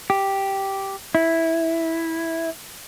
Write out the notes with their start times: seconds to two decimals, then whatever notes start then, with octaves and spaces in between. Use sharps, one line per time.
0.10 G4
1.15 E4